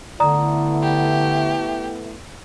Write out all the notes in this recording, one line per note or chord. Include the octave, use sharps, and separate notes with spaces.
D3 A3 B3 E4 D5 A#5 D#6
G4